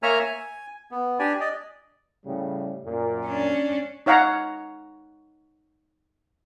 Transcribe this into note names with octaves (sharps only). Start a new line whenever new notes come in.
A#3 C#5 E5 G#5 A#5 F6
G#5
B3
D4 G4 D5 G#5
D5 D#5
A2 C#3 G3
F#2 A#2
C#4 D4
D#4 C#5 F5 F#5 A#5